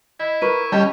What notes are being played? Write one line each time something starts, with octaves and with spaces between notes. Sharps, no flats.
E4 D#5
A#4 B4 C#6 D#7
G3 C#4 D#5 A5